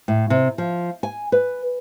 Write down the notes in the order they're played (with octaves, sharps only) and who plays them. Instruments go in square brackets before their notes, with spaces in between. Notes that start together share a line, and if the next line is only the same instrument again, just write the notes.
[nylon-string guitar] A2
C3
F3
G#5
B4